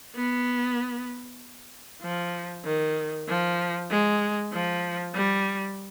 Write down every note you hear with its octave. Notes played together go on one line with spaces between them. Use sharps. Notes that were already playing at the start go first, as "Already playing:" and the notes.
B3
F3
D#3
F3
G#3
F3
G3